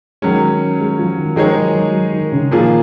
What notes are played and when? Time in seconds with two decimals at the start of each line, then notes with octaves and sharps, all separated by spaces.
0.22 D#3 F#3 G#3 C#4
0.80 G#3
0.99 F3
1.18 D#3
1.36 D#3 F3 G#3 D#4 G#4 C#5
1.55 F#3
1.75 F#3
1.94 F#3
2.13 D#3
2.32 C#3
2.51 A#2 D#3 F3 A#3 F4 G#4